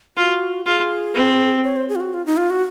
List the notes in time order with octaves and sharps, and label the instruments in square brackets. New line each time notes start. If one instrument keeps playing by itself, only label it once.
[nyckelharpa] F4 [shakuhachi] F#4
[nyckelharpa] F4 [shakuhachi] G#4
[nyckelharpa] C4
[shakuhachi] C#5
C5
G#4
F4
F#4
F4
D#4
F4
F#4